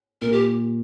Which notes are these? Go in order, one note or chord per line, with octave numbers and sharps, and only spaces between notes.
A#2 A#4
G4